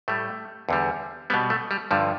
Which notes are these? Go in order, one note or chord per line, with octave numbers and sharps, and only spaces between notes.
A2 G3 A3
E2 D3 G3
B2 G3 B3
A3
G3
G2 D3 F3 G3